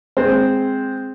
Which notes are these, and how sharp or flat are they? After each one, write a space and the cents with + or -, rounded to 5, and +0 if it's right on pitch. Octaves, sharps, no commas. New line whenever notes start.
G#3 +0 C4 +0